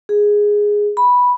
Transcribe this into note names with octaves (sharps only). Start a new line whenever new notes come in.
G#4
B5